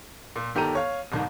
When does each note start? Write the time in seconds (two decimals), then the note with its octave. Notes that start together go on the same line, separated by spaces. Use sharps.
0.36 A#2
0.55 G1 D#3 G4 A4 A#5 D#7
0.75 C#5 F5
1.12 D1 C2 D#3